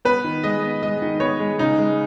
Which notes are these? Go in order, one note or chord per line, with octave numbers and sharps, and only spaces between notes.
B3 B4
D#3
G#3 D#5
B3
G#3 D#5
D#3
B3 C#5
G#3
C#3 D#4
G#3